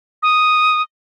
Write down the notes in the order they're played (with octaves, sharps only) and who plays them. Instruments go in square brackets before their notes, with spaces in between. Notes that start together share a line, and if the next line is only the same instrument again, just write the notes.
[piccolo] D#6